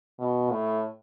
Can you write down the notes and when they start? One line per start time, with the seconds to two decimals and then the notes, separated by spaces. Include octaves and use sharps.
0.19 B2
0.50 A2